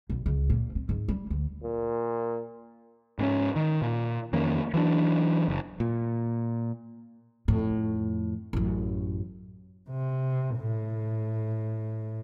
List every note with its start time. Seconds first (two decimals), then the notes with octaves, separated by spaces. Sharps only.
0.10 B1
0.26 C#2
0.50 A#2
0.75 C4
0.89 G#2
1.08 G3
1.30 D2
1.63 A#2
3.19 G#2 C4 C#4
3.56 D#3
3.82 A#2
4.33 F2 D#3 A#3 C#4
4.74 E3 F#3 G#3 D4
5.48 F#1
5.80 A#2
7.48 F2 A2
8.53 A1 F#2
9.90 C3
10.56 A2